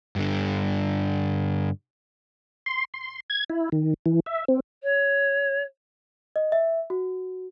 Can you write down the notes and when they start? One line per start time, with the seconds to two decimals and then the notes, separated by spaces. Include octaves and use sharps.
0.16 G2 D3
2.66 C6
2.94 C6
3.30 G#6
3.50 E4
3.72 D#3
4.06 E3
4.26 E5
4.48 C4
4.83 C#5
6.36 D#5
6.52 E5
6.90 F#4